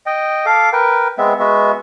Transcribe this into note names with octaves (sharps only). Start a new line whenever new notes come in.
D#5 G5
A4 F5 D6
A#4 B4 G5
G#3 B3 C4 E5
G#3 B3 F#4 E5